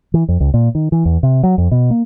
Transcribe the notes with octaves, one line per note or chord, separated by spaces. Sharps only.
E3
F2
C#2
A#2
D#3
E3
E2
C3
F#3
F2
B2
A#3